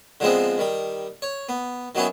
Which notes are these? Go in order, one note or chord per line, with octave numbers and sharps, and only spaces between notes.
D3 F3 G#3 B3 C4
D#3 G3
C#5
B3
D#3 F#3 B3 C#4 E4